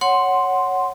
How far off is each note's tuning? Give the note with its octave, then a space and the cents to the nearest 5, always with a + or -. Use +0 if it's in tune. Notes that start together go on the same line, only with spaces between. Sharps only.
C#5 +0 F#5 +0 C6 +0